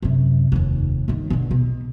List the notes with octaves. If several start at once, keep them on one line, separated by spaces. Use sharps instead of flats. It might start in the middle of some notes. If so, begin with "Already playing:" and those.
F#2 C3
F1 D#2
G1 D#3
B1 D3
B2